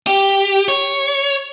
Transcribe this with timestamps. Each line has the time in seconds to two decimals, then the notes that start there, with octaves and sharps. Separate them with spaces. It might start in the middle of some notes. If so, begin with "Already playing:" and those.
0.07 G4
0.68 C#5